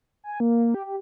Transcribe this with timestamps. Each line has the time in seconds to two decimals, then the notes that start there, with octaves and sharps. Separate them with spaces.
0.24 G#5
0.40 A#3
0.74 G4
0.86 G4